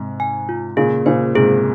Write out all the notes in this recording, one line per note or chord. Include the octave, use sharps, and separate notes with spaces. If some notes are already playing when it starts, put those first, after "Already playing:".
Already playing: G#2 C3
G#5
F4
A#2 C#3 G#4
A#2 C#3 C5
G#2 C3 G#4